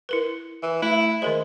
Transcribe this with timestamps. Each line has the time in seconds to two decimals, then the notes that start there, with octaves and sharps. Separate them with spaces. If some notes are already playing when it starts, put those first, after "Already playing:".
0.09 E4 A#4 B4
0.62 E3
0.82 A3 E4
1.22 D#3 G#3 A#4 C5